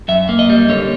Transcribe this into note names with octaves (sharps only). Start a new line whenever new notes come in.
F#2 E5
A#3
D#5
G3
D3 C#5